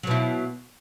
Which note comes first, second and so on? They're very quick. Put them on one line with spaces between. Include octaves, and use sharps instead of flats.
F#3 B2 E4